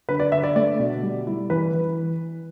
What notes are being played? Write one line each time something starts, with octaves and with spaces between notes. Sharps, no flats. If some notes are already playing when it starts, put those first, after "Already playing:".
D3 B4
D5
D3 E5
D5
A3 D5
B2
G3
E4
E3 B4
E3